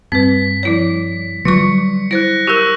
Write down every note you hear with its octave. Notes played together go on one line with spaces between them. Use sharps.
G2 C4 B4 B6
F3 E4 C#5
D3 F#3 G3 F4 C#6 C#7
E4 C5 F#6 A#6
G4 A#4 C#6 E6 F#6